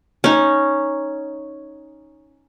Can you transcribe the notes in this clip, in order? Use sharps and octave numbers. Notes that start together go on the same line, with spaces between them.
C#4 D#4